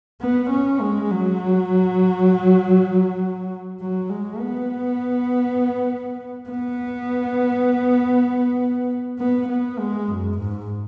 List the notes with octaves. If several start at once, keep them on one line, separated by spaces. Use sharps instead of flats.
B3
C#4
G#3
F#3
F#3
G#3
B3
B3
B3
B3
G#3
F#2
G#2